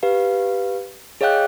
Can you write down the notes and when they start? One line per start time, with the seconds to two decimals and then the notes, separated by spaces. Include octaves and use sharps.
0.03 G4 B4 F5
1.21 G#4 C#5 D#5 F5 G5 F#6